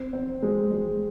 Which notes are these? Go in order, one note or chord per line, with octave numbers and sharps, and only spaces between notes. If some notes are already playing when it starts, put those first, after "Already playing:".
Already playing: C4
C4
G#3
G#3